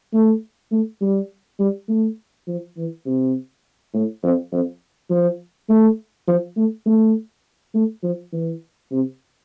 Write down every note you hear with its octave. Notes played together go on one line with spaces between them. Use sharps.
A3
A3
G3
G3
A3
F3
E3
C3
A2
F2
F2
F3
A3
F3
A3
A3
A3
F3
E3
C3